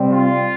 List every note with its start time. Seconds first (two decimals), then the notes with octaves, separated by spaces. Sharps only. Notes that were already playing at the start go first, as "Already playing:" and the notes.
Already playing: C3 G3 C4
0.09 F4